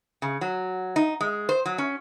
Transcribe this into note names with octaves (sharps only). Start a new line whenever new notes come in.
C#3
F#3
D#4
G#3
C5
F#3
C#4